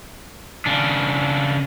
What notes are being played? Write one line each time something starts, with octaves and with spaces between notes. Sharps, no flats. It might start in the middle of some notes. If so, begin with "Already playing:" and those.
C#3 D4